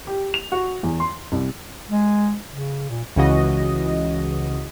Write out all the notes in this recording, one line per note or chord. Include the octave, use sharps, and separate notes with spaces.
G4
F7
F#4
E2
C6
C2
G#3
C#3
A#2
C#2 C#3 E3 F#4 D#5